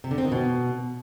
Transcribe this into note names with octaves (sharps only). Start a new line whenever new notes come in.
C3
D3
C4
D#3
B2